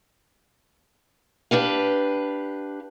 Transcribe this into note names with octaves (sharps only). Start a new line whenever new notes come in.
D4 G4 B4 F5